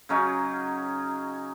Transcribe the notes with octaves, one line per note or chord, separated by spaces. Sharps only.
C#3 F#3 C#4 D#4